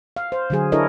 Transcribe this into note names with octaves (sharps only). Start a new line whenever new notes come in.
F5
C5
D3 F#3 G#4
D4 E4 A4 A#4 C#5 D#5